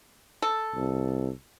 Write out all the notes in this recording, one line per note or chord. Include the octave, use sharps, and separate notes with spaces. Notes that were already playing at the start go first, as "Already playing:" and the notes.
A4
C2